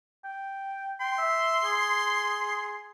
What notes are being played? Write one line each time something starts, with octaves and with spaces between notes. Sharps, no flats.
G5
G5 C6
E5
G#4